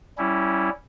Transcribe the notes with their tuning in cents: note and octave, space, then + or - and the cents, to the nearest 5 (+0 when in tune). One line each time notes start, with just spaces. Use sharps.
G3 -15 C#4 +0 E4 +0